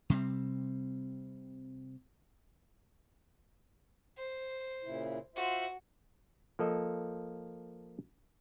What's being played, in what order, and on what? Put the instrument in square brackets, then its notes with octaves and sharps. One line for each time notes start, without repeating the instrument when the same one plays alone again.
[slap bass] C3 G3 C4
[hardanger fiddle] C5
[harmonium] A#2 C#3 E4
[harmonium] F4 C5 E5 [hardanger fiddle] F#4
[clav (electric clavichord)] F3 A#3 A4 D#5